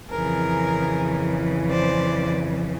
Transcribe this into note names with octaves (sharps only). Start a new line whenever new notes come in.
F2 C#3 E3 G#4 A#4
C5 D5